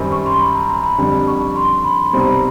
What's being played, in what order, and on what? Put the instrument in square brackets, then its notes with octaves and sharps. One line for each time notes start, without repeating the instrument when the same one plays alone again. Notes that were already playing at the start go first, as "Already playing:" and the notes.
Already playing: [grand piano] F#2 D#3 G3 C4 [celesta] B5
[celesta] C#6
C6
B5
A#5
A#5
B5
[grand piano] F2 D3 G3
[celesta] C#6
C6
B5
[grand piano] C2 B2 G3 C4 D#4 [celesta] B5
[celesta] A#5
B5